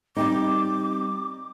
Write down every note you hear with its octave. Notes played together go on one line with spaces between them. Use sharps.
G3 C4 D#4 D6